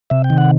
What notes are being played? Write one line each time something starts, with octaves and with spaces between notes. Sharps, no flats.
C3 E5
G5
D#3
F#5